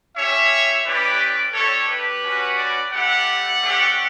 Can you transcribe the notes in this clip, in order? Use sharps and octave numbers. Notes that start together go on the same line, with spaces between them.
C#4 G4 C#5 E5
G3 C#4 E4 G4 B4 D5
A3 D4 G4 A4 C#5
G4 B4
C#4 F#4
B4 D5
A3 E4 G4 D5 F#5
A3 C#4 G4